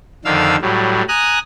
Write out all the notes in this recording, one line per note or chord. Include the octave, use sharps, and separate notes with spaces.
F2 D3 D#3 F5 E6
A2 F#3 G3
G#5 A#5 D#6 F#6